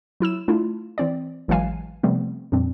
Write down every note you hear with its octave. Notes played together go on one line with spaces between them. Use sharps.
F#3 E4 E6 E7
A3 D4 E4 F4
E3 C4 D5
A1 E3 F#3 G#3 F5 G#5
C3 F3 G3 A3 B3 C4
F2 A#2 G3 C4 D4